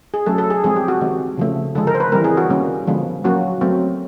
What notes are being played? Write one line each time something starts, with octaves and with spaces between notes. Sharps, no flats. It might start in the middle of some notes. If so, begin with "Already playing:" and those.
G#4
F#3 A3 C#4 A4
A4
G#4
F3 G#3 C4 G#4
G4
F#4
D#3 G#3 C4
C#3 F3 A3 C#4
D3 F3 G#3 A4
A#4
C5
B4
E3 G3 C4 A#4
G#4
F#4
D#3 G3 A#3 C#4
D3 F3 G#3 B3
F#3 A#3 C#4 F#4
F#3 A3 C4